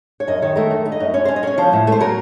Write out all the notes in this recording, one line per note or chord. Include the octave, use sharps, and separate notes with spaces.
C#5
F#2 D#5
D#3 C#5
A3 A#4
F#2
D#4
D#5
F#2
C#4 C#5
C5
C#4
D#5
C#4 C#5
F3 C5
A2
A3 C5
F#3 A#4